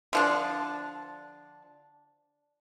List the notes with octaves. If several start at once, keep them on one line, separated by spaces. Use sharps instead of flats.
D3 F3 D4